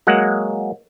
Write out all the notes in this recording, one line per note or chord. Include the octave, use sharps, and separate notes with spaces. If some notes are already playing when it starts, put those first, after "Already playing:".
F#3 G#3 A#3 F#5